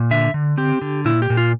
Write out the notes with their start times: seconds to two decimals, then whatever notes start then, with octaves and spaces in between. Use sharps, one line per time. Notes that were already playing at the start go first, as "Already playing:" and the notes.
Already playing: A#2
0.11 D3 E5
0.34 D3
0.57 C4 G4
0.82 D3
1.05 A#2 E4
1.22 G4
1.30 A#2
1.37 F4